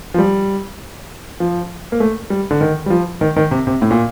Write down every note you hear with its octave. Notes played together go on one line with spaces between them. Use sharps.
F3
G3
F3
A#3
A3
G3
D3
D#3
G3
F3
D#3
D#3
C3
C3
A2
A#2